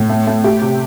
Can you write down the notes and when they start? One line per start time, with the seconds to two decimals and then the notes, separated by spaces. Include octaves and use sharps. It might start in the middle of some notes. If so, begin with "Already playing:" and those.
Already playing: A2
0.10 A3
0.27 A3
0.44 A3 G4
0.62 C3